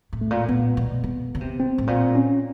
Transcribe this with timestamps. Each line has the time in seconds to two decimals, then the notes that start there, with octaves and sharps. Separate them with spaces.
0.13 A2
0.21 A3
0.31 A#2
0.49 A#2 B3
0.77 B2
1.04 B2
1.35 C#3
1.41 C3
1.60 C4
1.78 A2
1.87 A#2 C4
2.15 C#4